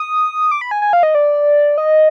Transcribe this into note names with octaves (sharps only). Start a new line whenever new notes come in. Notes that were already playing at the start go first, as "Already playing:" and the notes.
Already playing: D#6
D6
B5
G#5
G#5
F5
D#5
D5
D#5